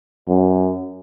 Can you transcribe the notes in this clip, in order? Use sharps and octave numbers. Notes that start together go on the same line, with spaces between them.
F#2